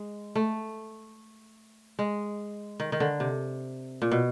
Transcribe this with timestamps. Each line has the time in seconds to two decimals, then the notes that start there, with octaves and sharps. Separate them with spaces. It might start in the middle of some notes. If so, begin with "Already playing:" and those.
Already playing: G#3
0.36 A3
1.99 G#3
2.80 D#3
2.92 D#3
3.00 D3
3.20 C3
4.02 A#2
4.12 B2